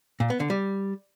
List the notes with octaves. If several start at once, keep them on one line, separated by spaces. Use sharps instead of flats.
A#2
B3
D3
G3